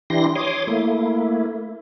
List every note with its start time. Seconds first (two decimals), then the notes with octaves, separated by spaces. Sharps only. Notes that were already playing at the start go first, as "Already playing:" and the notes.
0.10 E3 D4 E4 G4 C6 A#6
0.35 C#5 C6 D6 D#6
0.67 A3 A#3 E4